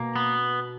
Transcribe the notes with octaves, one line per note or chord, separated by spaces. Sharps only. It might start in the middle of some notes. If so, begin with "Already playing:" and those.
Already playing: B2 A#3
B3